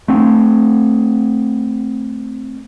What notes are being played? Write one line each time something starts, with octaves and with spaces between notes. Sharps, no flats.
A3 C4